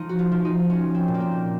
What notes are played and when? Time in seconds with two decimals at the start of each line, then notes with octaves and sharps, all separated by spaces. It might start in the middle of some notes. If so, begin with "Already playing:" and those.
Already playing: F3 D#4
0.09 F#4
0.19 F4
0.31 F3
0.45 D#4
0.70 F3 C#4
0.95 C4
1.08 A#2
1.14 A#3
1.20 C4